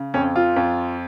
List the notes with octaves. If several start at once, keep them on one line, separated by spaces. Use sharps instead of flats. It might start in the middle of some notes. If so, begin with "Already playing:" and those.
Already playing: C#3
F2 C#4
F4
F2